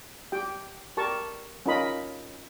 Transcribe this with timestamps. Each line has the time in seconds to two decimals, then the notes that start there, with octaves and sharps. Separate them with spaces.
0.32 G4 G5
0.97 G4 A#4 A5 C#6
1.66 C#4 D#4 F4 A#4 D#5 B5